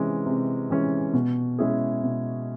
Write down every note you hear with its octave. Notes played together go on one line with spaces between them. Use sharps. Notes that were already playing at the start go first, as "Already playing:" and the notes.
Already playing: C3 E3 G#3 C#4
C3
E3 G#3 C#4
B2
G#3 C#4 E4 G#4
B2